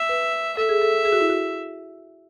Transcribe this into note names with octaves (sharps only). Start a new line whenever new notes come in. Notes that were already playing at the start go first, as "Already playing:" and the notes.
Already playing: E5
B4
A4 E5
G#4
A4
G#4
F#4
E4
F#4